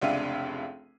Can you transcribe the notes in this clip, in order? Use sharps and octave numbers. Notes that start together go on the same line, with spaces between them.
F1 C#2 D4 E5 F5 D#7